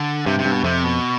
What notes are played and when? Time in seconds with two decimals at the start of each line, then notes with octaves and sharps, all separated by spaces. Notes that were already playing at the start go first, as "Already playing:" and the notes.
Already playing: D3
0.26 G2 C3
0.39 C3
0.45 G2
0.52 B2
0.64 F2 C3
0.84 B2